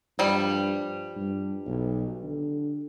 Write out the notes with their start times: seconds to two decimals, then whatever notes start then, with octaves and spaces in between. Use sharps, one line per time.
0.19 G2 F3 G3
1.17 G2
1.66 B1
2.24 D3